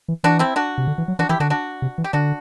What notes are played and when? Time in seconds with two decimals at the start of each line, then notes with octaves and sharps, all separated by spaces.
0.08 E3
0.24 E3 D4 F#4
0.39 C4 E4
0.56 D4 F#4
0.78 C3
0.87 D3
0.98 E3
1.08 F#3
1.19 E3 D4 F#4
1.29 E3 E4 G4
1.40 D3 D4 F#4
1.50 D4 F#4
1.82 C3
1.98 E3
2.04 G4
2.13 D3 D4 F#4